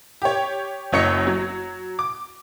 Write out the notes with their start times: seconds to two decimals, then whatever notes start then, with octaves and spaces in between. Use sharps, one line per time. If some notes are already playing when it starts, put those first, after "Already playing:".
0.22 G4 C#5
0.92 F#1 F#2 C#5 D#5 C#7
1.27 F#3
1.99 D6